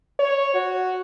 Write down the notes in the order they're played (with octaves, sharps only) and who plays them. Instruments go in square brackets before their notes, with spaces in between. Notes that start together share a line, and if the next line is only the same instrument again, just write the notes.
[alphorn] C#5
F#4